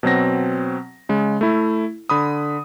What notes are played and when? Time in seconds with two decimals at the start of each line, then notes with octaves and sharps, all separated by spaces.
0.03 B2 F#3 C4 A#6
1.09 C#3 G#3
1.41 A3 E4
2.09 D3 B5 D#6